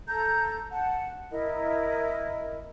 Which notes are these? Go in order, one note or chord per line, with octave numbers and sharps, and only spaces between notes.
A4 A#5 G6
F#5 A5
E4 A#4 D#5